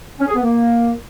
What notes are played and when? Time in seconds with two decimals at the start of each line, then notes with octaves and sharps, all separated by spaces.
0.19 C#4
0.27 G#4
0.35 B3
0.43 A#3